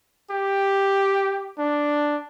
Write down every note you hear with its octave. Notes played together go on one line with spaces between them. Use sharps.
G4
D4